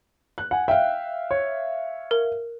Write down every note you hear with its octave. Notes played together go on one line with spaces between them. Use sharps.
F#6
F#5 G#5
E5 F5 G5
C#5
A#4